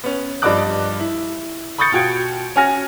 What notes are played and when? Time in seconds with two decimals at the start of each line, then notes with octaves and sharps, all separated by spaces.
0.04 B3 C#4
0.42 G2 F3 D5 D#5 D6 F#6
1.00 E4
1.78 B5 C#6 D#6 G6 A6 C#7
1.92 B2 F4 F#4 G5 G#6 D7
2.56 C#4 F#4 G#5 F6 A#6